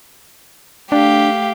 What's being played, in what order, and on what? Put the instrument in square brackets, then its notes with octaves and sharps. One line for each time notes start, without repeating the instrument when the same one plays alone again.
[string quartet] A3 G4 F5 [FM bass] D4